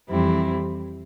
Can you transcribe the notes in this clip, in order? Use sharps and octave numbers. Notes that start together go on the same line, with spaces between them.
F2 E3 G3 C4 E4